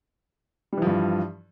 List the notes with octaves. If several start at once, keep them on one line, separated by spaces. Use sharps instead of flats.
G2 E3 F3 G3